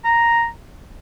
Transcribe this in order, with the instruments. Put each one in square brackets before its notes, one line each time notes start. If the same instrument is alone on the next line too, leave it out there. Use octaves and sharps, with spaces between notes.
[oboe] A#5